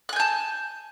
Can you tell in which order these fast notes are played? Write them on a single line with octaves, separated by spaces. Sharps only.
F#6 G#5 G6 A5